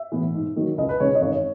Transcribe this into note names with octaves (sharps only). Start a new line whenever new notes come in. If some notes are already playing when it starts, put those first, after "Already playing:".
Already playing: E5
A2 E3 B3
G#2
D#3 F#3
C#2 D#5
B4
C#3 G#3 D#4 C#5
D#5
G#1 C#5